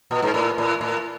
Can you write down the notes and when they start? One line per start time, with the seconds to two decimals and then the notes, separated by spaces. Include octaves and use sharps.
0.11 A#2
0.22 G#2
0.34 A2
0.58 A2
0.81 A2